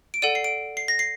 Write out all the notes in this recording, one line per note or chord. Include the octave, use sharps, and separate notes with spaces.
D7
A4 D5 F#5 D#7
C7
D7
C7
A#6
C7